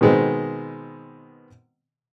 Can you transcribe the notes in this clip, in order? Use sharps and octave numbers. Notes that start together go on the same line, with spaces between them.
B2 D#3 G#3 B3 C4